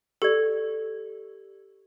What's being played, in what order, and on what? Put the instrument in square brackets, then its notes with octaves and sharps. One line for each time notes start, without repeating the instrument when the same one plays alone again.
[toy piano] G4 D5 [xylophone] A4